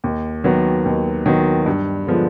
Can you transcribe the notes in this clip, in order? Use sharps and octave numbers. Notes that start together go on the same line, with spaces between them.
D#2
D#3 F#3 B3
D#2
D#3 F#3 B3
G2
D3 F3 G#3 B3